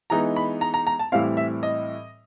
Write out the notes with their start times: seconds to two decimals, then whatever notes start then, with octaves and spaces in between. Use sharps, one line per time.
0.10 E3 G#3 B3 D#4 A#5
0.36 B5
0.61 A#5
0.74 A#5
0.87 A#5
0.99 A5
1.12 A2 E3 G3 C4 E4 F5
1.37 E5
1.63 D#5